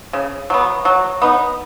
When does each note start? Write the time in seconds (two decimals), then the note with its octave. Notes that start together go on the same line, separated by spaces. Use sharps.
0.13 C#3
0.50 F#3 B3
0.85 F#3
1.22 B3 D#4